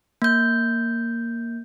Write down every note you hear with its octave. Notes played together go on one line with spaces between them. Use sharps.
A#3 G6